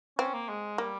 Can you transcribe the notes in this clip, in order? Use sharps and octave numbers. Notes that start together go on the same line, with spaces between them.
C4 C#4
A#3
G#3
G3 A#3